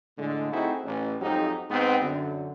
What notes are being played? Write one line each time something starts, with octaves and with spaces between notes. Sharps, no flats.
A2 D3 G#3
A3 C4 D#4 E4 F#4 G#4
A1
F2 G#2 F#3 D#4 G4
G#2 B3 C4
F#2 D3